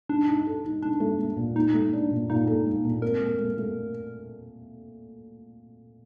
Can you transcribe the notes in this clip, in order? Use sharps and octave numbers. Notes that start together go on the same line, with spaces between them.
D4 D#4
D#4
A4
D#4
D4 D#4
A3
A3
A#2
A#2 D#4
A3
D4
A#2
A#2 D#4
A4
A3
A#2
C4 A#4
A3
A3
A3